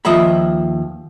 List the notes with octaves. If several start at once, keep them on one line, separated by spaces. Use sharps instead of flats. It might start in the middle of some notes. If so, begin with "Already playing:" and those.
D#2 F3 D#5 E5 B5